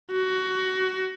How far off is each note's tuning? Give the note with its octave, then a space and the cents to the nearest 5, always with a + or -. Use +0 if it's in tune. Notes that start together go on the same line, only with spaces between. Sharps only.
F#4 +20